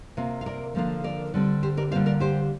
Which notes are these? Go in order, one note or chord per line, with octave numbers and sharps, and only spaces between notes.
C3 A#3 F4
F5
A#4 D5
D3 F3 A#3 D4 F4
A#4 D5
D3 G3 C4
G4 C5
A#4 D5
D3 G3 A#3 F4 C5 F5
A#4 D5
G4 C5